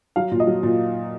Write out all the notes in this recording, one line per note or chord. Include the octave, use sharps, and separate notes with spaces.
F#3 F5
A#2
D#5
F#3
A#2